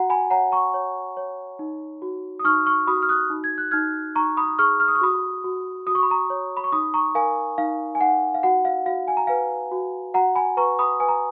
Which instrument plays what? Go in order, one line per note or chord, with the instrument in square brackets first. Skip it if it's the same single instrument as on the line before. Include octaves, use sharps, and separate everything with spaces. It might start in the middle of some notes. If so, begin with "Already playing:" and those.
Already playing: [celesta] F#4 F#5 A#5
G#5 B5
C#5 F#5 A#5
A#5 C#6
C#5
C#5
D#4
F#4
D#6
D#4 C#6 F6
C#6 F6
F#4 B5 D#6
F6
D#6 F#6
D#4
G#6
F#6
D#4 F6 G#6
D#4 A#5 C#6
B5 D#6
G#4 C#6 F6
F6
D#6
C#6
F#4 B5 D#6
F#4
F#4 D#6
C#6
B5
A#5 C#6
C#5
B5
C#6
D#4 B5 D#6
A#5 C#6
A#4 F5 G#5
D#4 F5
G#5
D#4 F#5
F5
F#4 F#5
F5
F#4 F5
G#5
A#5
B4 F5 G#5
F#4
F#4 F#5 A#5
G#5 B5
B4 A#5 C#6
B5 D#6
B4 G#5
A#5